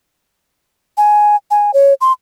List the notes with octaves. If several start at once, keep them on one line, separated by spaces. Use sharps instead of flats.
G#5
G#5
C#5
C6